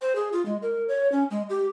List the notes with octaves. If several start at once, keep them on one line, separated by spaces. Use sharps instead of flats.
C5
G#4
F4
G#3
A#4
C#5
C#4
G#3
G4